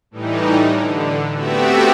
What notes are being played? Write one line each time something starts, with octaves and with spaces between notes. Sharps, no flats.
A2 E3 G3 D#4
D3
A3 B3 C4 F#4 G4 E5